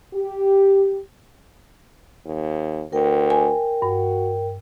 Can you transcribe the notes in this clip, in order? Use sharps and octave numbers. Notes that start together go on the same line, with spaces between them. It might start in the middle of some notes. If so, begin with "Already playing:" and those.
G4
D#2
D2 A#4 G5
G#5
G2 F#4